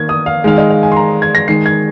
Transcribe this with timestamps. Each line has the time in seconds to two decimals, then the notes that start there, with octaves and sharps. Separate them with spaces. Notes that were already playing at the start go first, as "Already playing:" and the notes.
Already playing: D#3 A#3 G#6
0.09 D#6
0.26 F5
0.44 D#3 G#3 F5
0.58 D#5
0.70 F5
0.83 G#5
0.92 C6
0.96 A#5
1.22 G#6
1.35 A#6
1.48 D#3 G#3 C7
1.66 G#6